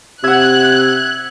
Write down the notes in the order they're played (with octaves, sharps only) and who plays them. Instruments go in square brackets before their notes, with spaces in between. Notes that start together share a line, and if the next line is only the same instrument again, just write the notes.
[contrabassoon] C3 [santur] E5 F#5 [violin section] F#6 [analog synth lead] G#6